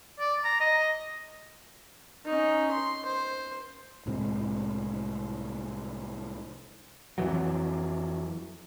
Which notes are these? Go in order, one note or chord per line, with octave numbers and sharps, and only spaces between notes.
D5
A#5
D#5
C#4 D#4
C6
C5
C2 A2 C3 G#3
F2 E3 F#3